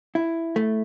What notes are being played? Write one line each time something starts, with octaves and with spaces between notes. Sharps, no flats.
E4
A3